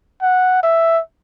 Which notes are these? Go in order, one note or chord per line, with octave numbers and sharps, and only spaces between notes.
F#5
E5